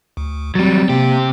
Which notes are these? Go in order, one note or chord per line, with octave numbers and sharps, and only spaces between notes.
D2
F#3 G3 C4 A6
C3 A#3 G4